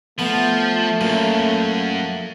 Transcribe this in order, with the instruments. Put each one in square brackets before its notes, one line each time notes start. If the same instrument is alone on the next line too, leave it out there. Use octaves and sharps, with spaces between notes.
[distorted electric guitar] F3 [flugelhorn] A3 [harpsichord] B3
[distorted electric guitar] F#2 [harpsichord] A#2